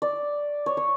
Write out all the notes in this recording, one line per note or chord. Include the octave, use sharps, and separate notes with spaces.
D5
C#5
C#5